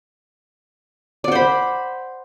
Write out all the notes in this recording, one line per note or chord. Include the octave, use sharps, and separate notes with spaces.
C5 D5 F#5 B5